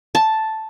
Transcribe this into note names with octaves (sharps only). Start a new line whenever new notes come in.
A5